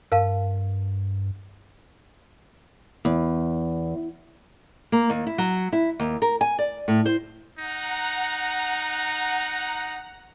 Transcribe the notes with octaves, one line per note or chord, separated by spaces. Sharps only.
G2 A#4 F5 A5
E2
A#3
D#2
E4
F#3
E4
D#2
A#4
G#5
D5
A2
C5
D#4 F#5 A#5